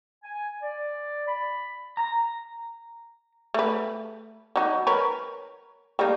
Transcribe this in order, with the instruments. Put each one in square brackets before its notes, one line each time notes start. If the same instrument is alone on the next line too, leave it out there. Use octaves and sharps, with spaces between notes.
[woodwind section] G#5
D5
B5
[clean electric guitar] A#5
[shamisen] A3 B4
F#3 D#4
A#4 B4 C#5
G3 A#3 D#4